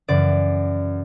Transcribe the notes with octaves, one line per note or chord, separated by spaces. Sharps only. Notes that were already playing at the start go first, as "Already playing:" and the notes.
F#2 C#3 E3 D5